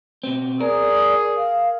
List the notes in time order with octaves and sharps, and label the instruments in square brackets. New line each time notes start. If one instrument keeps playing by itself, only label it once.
[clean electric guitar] B2 C4
[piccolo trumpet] G#4 [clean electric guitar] A#4 [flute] D5
[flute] F5